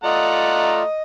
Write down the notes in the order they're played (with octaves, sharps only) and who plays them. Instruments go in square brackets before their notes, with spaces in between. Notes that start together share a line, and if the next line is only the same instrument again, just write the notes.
[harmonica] A3 F#5 A#5 [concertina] F4 D5 [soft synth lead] D#5